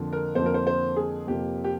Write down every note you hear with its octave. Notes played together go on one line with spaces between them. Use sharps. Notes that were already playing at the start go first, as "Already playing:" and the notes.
Already playing: F2 D3 F3 A#3
A#4
F2 D3 F3 A#3 C5
A#4
C5
C5
G#4
F2 C3 F3 A#3 G4
G4